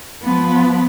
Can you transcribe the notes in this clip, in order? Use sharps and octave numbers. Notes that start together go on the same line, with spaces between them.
F3 B3